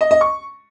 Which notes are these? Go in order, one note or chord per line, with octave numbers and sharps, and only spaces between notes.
D#5
D#5
C#6